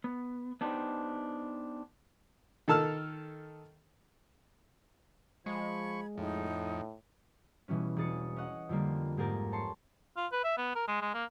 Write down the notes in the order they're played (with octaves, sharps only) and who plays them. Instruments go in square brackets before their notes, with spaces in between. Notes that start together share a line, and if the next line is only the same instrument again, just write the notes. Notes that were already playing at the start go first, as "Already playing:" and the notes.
[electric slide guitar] B3
B3 D4 D#4 G4 B4 C5
[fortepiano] D#3 A4 A5 E6 F6
[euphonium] F3 [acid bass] G#3 [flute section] B5 G#6 [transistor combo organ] C#6
[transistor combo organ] F2 [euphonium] A2 [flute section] D#4
[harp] B2 E3 G3 C#4
E1 G#4 D#6 A6 C#7
C#4 D#5 F#5
F2 D3 G3 A#3
G#2 A#3 G4 G#4 A#4 A6
C#5 A5 C6 C#6
[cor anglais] F4
B4
E5
B3
A#4
G#3
G#3
A#3